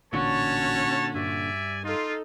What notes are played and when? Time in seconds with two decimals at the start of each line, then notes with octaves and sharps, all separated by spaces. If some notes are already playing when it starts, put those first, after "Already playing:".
0.13 A1 A#2 D3 C#4 F#4 C#5 A5
1.15 G2 D5 E5 G#5
1.84 D#4 F4 A4